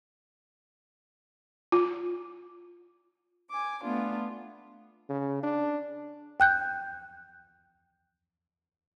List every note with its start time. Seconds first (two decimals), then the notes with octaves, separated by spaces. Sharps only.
1.72 F4
3.50 G#5 D6
3.83 A3 B3 D4 F4
5.09 C#3
5.43 D4
6.40 G5 F#6 G6